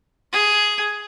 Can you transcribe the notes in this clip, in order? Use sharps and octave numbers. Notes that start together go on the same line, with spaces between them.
G#4